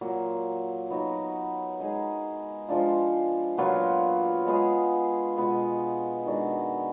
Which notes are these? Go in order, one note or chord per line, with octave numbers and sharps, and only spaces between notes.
A#2 F#3 A#3
F#3 B3 D#4 F#4
G#3 D#4 G#4
F3 G#3 D4 F4
A#2 F#3 B3 F4
G#3 B3 F4 G#4
B2 G#3 B3 F4
D#3 G#3 D4 F#4